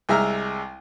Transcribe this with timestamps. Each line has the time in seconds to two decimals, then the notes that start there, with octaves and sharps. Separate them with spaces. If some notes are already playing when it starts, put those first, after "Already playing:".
0.09 C2 G#3 E5 A#5 F6